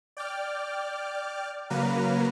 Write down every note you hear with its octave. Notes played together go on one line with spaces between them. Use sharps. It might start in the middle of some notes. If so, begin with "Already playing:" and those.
D5 G5 D6 F6
C#3 F#3 A#3 B4 F5 A#5